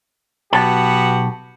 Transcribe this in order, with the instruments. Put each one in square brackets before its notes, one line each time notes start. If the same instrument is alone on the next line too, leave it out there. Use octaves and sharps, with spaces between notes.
[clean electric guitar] B1 A5 [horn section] B3 F#4 G4